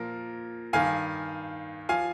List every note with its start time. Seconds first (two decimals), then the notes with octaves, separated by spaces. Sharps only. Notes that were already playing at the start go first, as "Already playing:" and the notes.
Already playing: A#2 F3 A#4
0.73 G2 D#3 F5 G#5
1.89 F3 F5 G#5